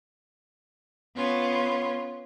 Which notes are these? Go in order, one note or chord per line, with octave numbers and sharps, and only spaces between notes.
B3 C#4 F4